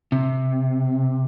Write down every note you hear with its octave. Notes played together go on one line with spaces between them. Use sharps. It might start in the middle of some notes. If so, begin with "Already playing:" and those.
C3